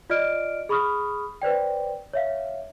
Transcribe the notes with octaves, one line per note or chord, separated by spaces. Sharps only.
F4 D5 D#5 F6 D7
G#4 B5 C#6 D#6 F6
B4 C5 D5 G5
C#5 E5 F5